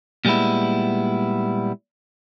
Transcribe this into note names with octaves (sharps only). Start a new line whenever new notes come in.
A#2 G3 G#3 B3 E4